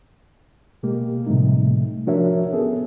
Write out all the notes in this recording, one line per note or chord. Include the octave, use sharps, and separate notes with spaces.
B2 G#3 A#3 G4
A2 C3 F3 G3 A3 D#4
F3 D4 F#4 A#4 C#5 E5
B3 C#4 G#4 A4